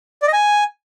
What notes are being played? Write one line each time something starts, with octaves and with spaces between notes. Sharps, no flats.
D5
D#5
G#5